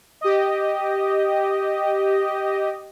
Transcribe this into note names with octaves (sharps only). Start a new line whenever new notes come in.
G4 D#5